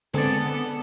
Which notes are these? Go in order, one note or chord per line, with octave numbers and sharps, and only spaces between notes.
D3 G#3 B3 C4 G#4 A4 D5